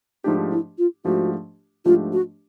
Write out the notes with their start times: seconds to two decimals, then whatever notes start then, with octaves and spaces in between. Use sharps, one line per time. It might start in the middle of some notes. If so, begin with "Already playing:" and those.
0.24 G#2 F3 A3 D4 D#4 G4
0.51 E4
0.78 F4
1.05 G#2 F3 A3 D4 F#4 G4
1.85 G#2 F3 A3 D4 F4 G4
2.12 F#4